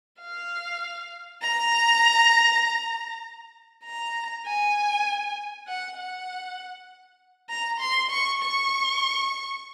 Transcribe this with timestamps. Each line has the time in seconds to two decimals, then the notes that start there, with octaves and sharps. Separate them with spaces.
0.21 F5
1.42 A#5
3.85 A#5
4.46 G#5
5.67 F#5
5.97 F#5
7.49 A#5
7.80 C6
8.10 C#6
8.40 C#6